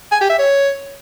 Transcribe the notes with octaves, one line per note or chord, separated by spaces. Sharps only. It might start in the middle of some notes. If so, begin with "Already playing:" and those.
G#5
G4
E5
C#5